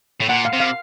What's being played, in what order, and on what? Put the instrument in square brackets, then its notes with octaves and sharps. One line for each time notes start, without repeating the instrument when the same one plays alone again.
[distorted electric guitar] A2
[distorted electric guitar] A#2 [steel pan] F#5
[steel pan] F5
[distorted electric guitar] C3
[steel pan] F5